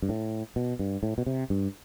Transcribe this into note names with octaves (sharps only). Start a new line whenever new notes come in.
G2
A2
B2
G2
A2
B2
C3
G2